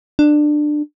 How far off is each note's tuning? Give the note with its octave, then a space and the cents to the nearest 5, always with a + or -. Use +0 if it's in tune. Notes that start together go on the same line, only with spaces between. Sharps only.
D4 +20